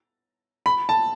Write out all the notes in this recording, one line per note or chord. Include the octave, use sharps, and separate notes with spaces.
B5
A5